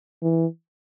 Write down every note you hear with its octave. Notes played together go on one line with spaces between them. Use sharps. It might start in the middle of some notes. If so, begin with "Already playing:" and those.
E3